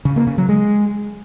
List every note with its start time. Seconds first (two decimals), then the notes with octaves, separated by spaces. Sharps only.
0.05 C#3
0.16 A#3
0.27 C#3
0.38 F#3
0.49 G#3